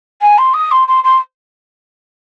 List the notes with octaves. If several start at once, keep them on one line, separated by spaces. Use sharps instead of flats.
G#5
C6
D#6
C6
C6
C6